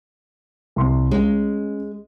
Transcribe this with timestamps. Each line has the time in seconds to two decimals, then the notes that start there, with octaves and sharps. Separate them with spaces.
0.76 C2 C6
1.11 G#3 C#4